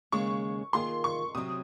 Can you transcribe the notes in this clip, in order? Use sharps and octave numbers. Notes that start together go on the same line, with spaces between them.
D#2 C#3 G#3 C#6
D#3 A#3 F4 G#4 C6
C#6
C3 F#3 C4 D#6